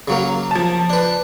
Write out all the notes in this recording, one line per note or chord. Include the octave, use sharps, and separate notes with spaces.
C#3 F#3 A#3
F3 A5
D4 B4